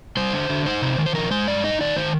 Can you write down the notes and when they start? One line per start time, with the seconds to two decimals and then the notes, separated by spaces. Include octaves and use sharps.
0.17 G3 C5
0.33 D3
0.49 D3
0.66 D#4 C5
0.82 C3
0.98 D#3
1.06 C5
1.15 F3 A#4
1.31 G#3 C5
1.47 G2 D5
1.64 D#4 D#5
1.80 D#3 D5
1.96 D#3 C5